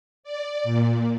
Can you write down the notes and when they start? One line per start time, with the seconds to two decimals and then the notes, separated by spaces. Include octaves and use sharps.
0.24 D5
0.64 A#2